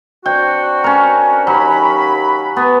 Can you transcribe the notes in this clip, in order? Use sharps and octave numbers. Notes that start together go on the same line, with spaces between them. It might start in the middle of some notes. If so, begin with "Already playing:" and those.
C4 D4 F#4 G5
C#4 A#4
D#2 F#3 B5
B3